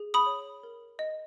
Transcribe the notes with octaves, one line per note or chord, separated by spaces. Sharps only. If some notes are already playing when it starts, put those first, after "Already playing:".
Already playing: G#4
B5 D#6
C#5
A#4
D#5